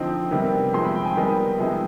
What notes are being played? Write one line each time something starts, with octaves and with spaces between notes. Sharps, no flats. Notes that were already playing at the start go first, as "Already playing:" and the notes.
Already playing: D3 F3 C4 D#4
C3 D#3 G3 B3
F3 G#3 C4 D#4 C6
B5
G5
G#5
D#3 G3 B3 D#4 B5
C3 F3 G#3 C4 D#4